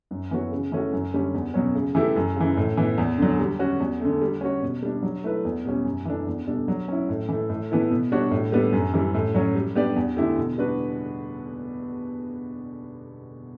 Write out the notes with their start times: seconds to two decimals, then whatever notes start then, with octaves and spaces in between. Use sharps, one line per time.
0.11 F#2
0.31 E3 B3 F#4 C#5
0.52 C#3
0.72 E3 A3 C#4 F#4
0.93 F#2
1.13 D3 G3 C#4
1.34 E2
1.54 B2 F#3 C#4
1.75 C#3
1.95 E3 A3 E4 G4
2.16 F#2
2.36 C#3 E3
2.57 A2
2.77 E3 B3
2.98 E2
3.18 D3 F#3
3.40 G3
3.59 C#4 F#4
3.80 E2
4.00 D3 A3
4.22 G3
4.41 C#4 F#4 C#5
4.62 B2
4.82 G3 D4
5.03 F#3
5.24 A3 E4 B4
5.45 E2
5.65 B2 G3 C#4
5.85 F#2
6.05 E3 A3 D4
6.27 E2
6.47 B2 G3 D4 A4
6.68 F#3
6.88 C#4 E4
7.09 A2
7.29 E3 A3
7.49 A2
7.70 E3 B3 E4 A4
7.90 B2
8.12 G3 D4 F#4 C#5
8.31 A2
8.52 G3 B3 D4 A4
8.73 F#2
8.94 E3 G3
9.14 A2
9.35 F#3 C#4
9.55 G3
9.75 B3 D4 G4 D5
9.96 E2
10.17 D3 A3 E4 G4
10.38 B2
10.58 G3 D4 F#4 B4